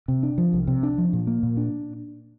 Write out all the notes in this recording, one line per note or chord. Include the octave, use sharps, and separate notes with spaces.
C3
D4
F3
C2
C3
D4
F3
A#2
A#3
A#2
D4